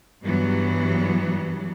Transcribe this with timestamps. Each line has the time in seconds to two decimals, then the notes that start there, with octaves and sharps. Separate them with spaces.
0.22 G2 E3 F#3 B3